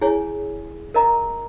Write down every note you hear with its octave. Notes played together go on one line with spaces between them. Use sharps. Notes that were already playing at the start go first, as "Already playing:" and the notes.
E4 G#4 C#5 G#5
A#4 D#5 A#5